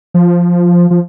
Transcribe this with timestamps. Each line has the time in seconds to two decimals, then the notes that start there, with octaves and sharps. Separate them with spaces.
0.14 F3
0.91 F3